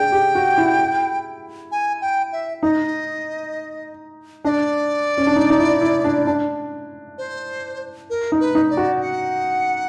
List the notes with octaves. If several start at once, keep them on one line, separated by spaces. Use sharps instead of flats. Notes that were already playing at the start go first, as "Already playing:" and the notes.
Already playing: D4 G#4 G5
G4
F#4
E4
G#5
G5
E5
D#4 D#5
D4 D5 D#5
C#4
D4
D#4
D#4
E4
E4
D4
D4
C5
A#4
D#4
B4
D#4
D5
F#4
F#5